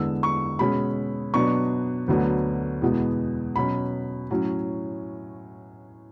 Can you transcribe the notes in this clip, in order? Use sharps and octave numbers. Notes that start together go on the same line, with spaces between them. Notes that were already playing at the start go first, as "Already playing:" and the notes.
Already playing: E2 D3 G#3 B3 E6
C#6
B2 G#3 C#4 B5
B2 F#3 B3 D4 C#6
D2 D3 F#3 B3
E2 B2 G#3 B3
B2 F#3 C#4 B5
A2 F#3 C#4